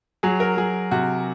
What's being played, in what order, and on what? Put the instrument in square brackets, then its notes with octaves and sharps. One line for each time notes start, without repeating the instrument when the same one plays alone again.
[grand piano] F#3 [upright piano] G#4
[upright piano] A#4
[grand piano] F#3 [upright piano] G#4
[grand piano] C3 [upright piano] F#4